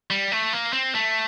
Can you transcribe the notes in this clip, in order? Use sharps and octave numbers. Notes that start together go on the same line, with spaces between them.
G3
A3
A#3
C4
A3